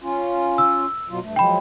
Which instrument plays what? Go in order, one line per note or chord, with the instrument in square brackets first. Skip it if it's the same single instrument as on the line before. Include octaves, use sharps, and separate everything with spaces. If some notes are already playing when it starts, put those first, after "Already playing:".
[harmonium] C#4 F4
[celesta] E6
[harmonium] B2 F#3 F4
G2 A3
[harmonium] F3 F#3 G#3 [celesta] G5 B5